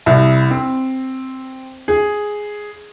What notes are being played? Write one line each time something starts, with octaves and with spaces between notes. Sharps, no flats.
C2
C4
G#4